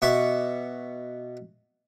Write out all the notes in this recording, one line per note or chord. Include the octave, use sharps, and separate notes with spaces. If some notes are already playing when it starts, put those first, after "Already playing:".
B2 E5 C#6 D6